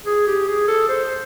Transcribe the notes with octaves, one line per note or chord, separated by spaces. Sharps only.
G#4
G4
G#4
A4
C5